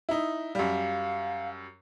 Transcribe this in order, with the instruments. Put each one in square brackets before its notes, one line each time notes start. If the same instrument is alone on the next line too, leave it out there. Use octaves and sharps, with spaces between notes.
[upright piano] D#4 E4
[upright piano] F#2 G3 [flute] F5